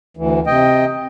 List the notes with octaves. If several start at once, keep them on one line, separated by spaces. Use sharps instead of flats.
D2 E3
C3 D#5 G5